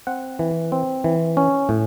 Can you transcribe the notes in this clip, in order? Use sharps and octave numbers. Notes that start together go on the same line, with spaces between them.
C4 F#5
E3
C4
E3
C#4
A2